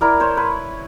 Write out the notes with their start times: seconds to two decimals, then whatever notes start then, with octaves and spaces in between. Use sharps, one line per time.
0.01 E4 A#4 D5
0.20 C5 C#5
0.37 B4